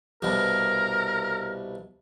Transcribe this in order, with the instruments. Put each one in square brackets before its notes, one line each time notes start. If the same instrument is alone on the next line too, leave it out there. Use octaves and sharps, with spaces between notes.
[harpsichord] C2 G2 B2 [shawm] A#4